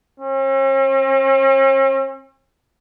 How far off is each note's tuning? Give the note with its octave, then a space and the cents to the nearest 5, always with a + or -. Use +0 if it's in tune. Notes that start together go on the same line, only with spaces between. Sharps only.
C#4 -45